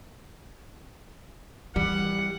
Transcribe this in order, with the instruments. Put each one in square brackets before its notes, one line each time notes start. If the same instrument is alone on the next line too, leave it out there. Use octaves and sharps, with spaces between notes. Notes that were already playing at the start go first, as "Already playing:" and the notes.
[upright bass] E3 [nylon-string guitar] G3 [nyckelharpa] F#5